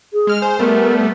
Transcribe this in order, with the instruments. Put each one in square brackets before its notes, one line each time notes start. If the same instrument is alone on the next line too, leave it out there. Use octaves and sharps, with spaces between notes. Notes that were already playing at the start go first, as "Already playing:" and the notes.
[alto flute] G#4
[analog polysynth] G#3 F6
[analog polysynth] C5 [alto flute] G#5
[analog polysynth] G3 A3 B3 [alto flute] A#4